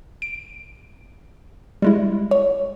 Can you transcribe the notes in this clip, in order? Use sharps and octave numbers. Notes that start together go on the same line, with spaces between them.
D7
G3 G#3 E4
C#5